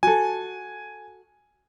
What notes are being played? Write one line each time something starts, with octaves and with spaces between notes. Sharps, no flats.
F#4 A4 G#5